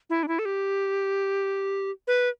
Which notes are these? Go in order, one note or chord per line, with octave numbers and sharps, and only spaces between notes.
E4
D4
E4
A4
G4
B4